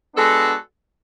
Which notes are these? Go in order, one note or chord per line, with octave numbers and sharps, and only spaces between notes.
G#3 B3 D4 F#4 A4